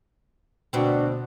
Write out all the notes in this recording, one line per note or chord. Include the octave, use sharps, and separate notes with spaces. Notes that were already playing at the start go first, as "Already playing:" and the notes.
D2 B2 C4 D4 F#4